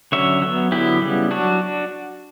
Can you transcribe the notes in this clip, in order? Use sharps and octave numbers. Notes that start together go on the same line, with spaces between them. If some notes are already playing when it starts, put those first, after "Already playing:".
D3 F#3 C#4 C#5 E5
F#3 B3
D3 F#3 B3 E4 G4
C#3 G3 B3
F#3 D4 F#4